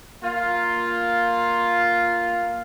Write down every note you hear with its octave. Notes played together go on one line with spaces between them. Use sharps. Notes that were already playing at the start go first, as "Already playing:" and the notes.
A#3 F4